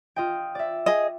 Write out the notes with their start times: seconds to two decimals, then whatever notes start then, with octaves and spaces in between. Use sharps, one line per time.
0.16 F4 D#5 G5
0.55 D5 E5
0.86 G#4 D#5